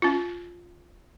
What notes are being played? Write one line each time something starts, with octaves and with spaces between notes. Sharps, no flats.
C#4 F4